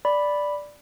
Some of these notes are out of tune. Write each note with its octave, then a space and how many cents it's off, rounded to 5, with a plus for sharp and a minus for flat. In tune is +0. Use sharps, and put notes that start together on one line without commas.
D5 +0 B5 +0